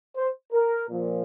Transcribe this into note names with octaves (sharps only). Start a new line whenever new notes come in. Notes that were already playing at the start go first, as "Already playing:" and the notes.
C5
A#4
A#2 F3